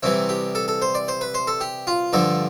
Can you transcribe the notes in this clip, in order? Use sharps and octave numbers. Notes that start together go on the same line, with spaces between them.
C2 C3 E3 G3 E4
G4
A4
A4
C5
D5
C5
B4
C5
A4
G4
F4
G2 D3 F3 A4